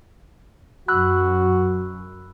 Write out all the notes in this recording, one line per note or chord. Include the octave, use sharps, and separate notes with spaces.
F#2 F#4 B5 E6 F#6